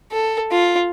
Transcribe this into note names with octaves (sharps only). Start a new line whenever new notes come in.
A4
F4